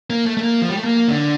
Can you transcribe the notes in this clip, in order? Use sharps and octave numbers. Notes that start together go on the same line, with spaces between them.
A#3
A3
A3
A#3
F3
G3
A3
A#3
D3